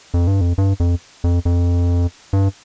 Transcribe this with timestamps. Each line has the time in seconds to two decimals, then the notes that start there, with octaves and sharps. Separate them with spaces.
0.14 F2
0.27 G2
0.41 F2
0.58 G2
0.80 F2
1.24 F2
1.45 F2
2.33 G2